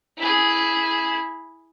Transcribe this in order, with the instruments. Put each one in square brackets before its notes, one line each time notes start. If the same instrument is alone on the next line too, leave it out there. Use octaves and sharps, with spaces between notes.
[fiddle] E4 G#4